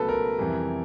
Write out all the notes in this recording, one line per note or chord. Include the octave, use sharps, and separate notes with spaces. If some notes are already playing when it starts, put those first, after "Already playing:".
Already playing: C#2 B2 F#3 A3 A4 B4
A#4
F2 C3 E3 G3